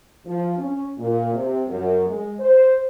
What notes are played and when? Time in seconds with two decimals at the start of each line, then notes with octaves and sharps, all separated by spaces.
0.26 F3
0.57 C#4
0.98 A#2
1.34 C3
1.67 F#2
2.06 G#3
2.39 C5